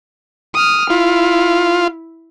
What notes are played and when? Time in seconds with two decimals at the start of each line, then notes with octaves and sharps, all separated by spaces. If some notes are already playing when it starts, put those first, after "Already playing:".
0.54 D#6 F6
0.90 E4 F4